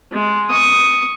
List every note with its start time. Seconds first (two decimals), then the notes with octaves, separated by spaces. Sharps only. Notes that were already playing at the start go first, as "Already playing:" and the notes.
0.12 G#3
0.50 C#6 D#6